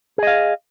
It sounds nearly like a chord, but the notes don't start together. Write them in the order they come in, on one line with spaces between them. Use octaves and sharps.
G#4 D#5 F5